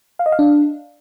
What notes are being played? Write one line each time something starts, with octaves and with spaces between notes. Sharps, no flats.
F5
D#5
F5
D4